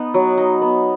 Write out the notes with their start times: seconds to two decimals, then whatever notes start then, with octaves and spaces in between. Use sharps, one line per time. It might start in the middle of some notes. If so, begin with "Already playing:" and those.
Already playing: B3 D#4
0.14 F#3
0.38 D#4
0.61 B3